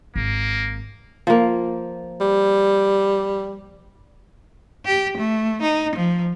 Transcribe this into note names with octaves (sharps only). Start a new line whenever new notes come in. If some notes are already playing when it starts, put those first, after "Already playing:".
G#1 A#3
F3 A#3
G3
G4
A3
D#4
F3